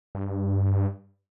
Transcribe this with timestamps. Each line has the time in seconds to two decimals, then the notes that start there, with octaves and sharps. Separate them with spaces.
0.15 G2